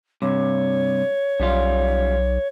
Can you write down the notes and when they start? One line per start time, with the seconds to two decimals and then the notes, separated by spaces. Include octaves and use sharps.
0.22 G2 C3 C#5
1.40 B1 F#2 G3 F4